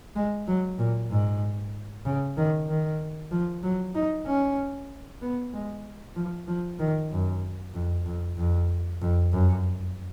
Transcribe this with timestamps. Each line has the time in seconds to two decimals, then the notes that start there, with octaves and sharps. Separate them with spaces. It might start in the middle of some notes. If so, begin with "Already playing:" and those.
0.16 G#3
0.47 F#3
0.78 A#2
1.11 G#2
2.05 C#3
2.37 D#3
2.69 D#3
3.32 F3
3.63 F#3
3.95 D#4
4.26 C#4
5.22 B3
5.53 G#3
6.16 F3
6.48 F3
6.79 D#3
7.11 F#2
7.74 F2
8.06 F2
8.37 F2
9.01 F2
9.32 F#2